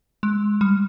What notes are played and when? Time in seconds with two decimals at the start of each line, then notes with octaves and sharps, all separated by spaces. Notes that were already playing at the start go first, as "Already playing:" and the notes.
0.23 G#3
0.61 G3